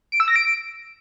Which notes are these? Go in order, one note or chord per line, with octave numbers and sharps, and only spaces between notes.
D7
E6
A#6
D7